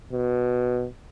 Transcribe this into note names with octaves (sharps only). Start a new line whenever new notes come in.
B2